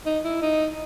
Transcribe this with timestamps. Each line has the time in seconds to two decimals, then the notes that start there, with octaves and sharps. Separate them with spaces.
0.06 D#4
0.24 E4
0.42 D#4